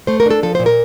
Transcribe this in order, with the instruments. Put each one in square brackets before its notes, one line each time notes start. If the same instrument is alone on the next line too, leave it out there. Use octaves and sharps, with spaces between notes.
[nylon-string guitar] A3 C5
A#4
D4 A4
F3 A4
A#2 C5
A#4